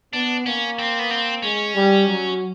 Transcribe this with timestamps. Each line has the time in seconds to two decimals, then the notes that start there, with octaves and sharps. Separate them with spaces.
0.13 B3 D4
0.46 A#3 C#4
0.79 C4
0.99 B3
1.10 C4
1.43 G#3 C#4
1.75 G3
2.08 F#3